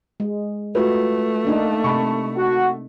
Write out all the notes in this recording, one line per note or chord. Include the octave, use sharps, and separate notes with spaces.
G#3
A3 F4 F#4 B4
A#3 D4 D#4
C3 A5 B5 C#6
F#4